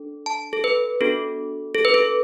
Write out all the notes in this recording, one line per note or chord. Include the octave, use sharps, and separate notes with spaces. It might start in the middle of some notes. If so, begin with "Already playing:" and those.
Already playing: D4 A4
A5
A4
B4
B3 D4 F#4 A4
A4
B4
A4